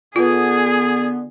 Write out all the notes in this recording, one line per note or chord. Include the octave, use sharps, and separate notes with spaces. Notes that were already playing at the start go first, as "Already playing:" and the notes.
D3 B3 F4 G#4 B4